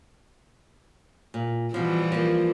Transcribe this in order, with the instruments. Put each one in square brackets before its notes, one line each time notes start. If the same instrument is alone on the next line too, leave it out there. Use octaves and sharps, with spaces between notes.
[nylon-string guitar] A#2
[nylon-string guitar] B2 F3 [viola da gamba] E3 G3 F4
[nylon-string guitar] F3 A#3